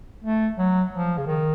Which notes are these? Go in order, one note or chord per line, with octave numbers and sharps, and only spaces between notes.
A3
F#3
F3
C#3
D#3